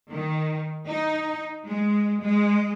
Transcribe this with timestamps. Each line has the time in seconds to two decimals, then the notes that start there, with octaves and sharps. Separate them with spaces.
0.11 D#3
0.87 D#4
1.66 G#3
2.21 G#3